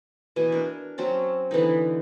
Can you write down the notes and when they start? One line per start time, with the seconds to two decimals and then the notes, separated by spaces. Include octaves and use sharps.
0.36 B2 E3 G#5
0.52 D4 A#4
0.98 F#3 C4 C#4 A5
1.51 D3 E3 B3 D#4